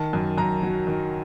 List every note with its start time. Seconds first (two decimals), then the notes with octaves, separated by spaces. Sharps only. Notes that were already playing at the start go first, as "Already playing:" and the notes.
Already playing: D#3 A5
0.13 F#2
0.38 F#2 A#5
0.63 F#3
0.87 D#3